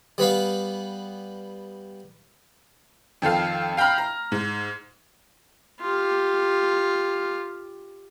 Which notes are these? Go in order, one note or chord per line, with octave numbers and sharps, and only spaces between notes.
G3 B3 B4 F5
F2 D#3 A4 F5
F5 G5 A#5 B5 F6
A#5
G#2
F4 G4